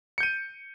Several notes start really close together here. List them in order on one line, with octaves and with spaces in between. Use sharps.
C#7 G6 D#7